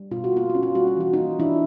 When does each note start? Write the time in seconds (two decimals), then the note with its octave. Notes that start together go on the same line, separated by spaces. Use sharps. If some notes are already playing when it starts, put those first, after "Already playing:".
Already playing: G3
0.11 B2 F4
0.24 F#4
0.32 A#3 F4
0.50 F#4
0.55 C#4
0.63 F4
0.75 G3 F#4
0.87 F4
0.97 E3 F#4
1.13 A#3 D#4 F4
1.39 E3 D4 E4